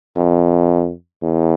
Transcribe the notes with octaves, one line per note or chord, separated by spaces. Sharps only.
F2
E2